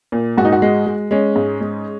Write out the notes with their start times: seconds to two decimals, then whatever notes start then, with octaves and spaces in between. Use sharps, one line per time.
0.12 A#2
0.38 G#2 F#4
0.45 D#4
0.53 F#4
0.62 G#3
0.86 G#3
1.11 G#3 C#4
1.36 G#2
1.61 G#3